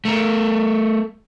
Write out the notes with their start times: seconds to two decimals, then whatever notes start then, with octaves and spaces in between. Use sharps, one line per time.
0.05 A3 A#4